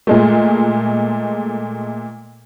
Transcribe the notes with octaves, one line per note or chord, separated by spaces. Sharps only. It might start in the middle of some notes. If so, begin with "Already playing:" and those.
A#2 G#3 A3